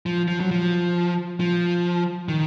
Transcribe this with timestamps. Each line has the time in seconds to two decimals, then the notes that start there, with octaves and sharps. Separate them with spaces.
0.06 F3
0.28 F3
0.41 F#3
0.51 F3
1.40 F3
2.29 D#3